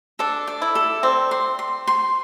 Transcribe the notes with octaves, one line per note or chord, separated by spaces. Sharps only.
D4 A4
D5
E4
A4
C4 D5
C6
C6
C6